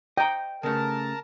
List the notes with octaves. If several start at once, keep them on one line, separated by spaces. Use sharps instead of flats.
D#5 G5 A#5
C#3 A3 A#4 A5